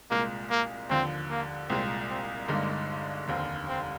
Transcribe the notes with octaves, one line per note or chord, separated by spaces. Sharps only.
C2 A#2 G#3 A#3
A#3
D#2 D3 F3 C4
A#3
C2 A#2 G#3 C4
C4
G1 G2 D3 G#3 A#3 D#4
F1 D#2 D3 C4
C4